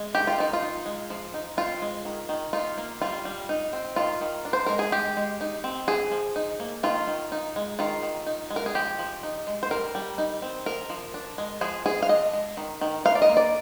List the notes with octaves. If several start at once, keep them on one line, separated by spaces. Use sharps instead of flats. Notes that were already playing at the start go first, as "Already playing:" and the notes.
Already playing: G#3
D#3 G4
F4
D#3 D#4
F4
D#4
G#3
F3
D#4
C4 F4
G#3
D#3
D#3
D#4 F4
A#3
G3 F4
G3
D#4
C4
D#3 F4
D#3
D4
C5
G#3 A#4
G#4
G#3 G4
G#3
D#4
C4
F3 G#4
F3
D#4
A#3
D#3 F4
D#3
D#4
G#3
D#3 F4
D#3
D#4
G#3
A#4
G#4
F3 G4
F3
D#4
G#3
C5
G3 A#4
G3
D#4
C4
F3 A#4
F3
D4
G#3
F3 G#4
F3 G#4
F5
D4 D#5
G#3
D#3
D#3
D#4 F5
D5
D#5
A#3
D5